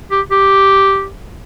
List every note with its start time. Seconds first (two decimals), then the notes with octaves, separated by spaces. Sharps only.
0.11 G4
0.31 G4